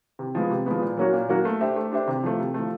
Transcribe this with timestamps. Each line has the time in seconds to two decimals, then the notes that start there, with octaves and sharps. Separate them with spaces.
0.19 C3
0.35 F3 G#3 B3
0.50 C3
0.66 F3 G#3 B3
0.82 A#2
0.97 F#3 A#3 C#4 F#4
1.13 A#2
1.29 F#3 A#3 C#4 F#4
1.45 A3
1.61 D4 G4 C5 E5
1.76 A3
1.92 D4 G4 C5 E5
2.07 C3
2.24 F3 A3
2.39 C3
2.54 F3 A3